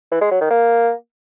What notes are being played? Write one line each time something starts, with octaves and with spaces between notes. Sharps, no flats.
E3
G#3
F#3
D#3
A#3